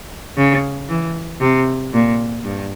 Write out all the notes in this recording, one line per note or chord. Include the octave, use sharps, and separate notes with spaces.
C#3
E3
C3
A#2
G2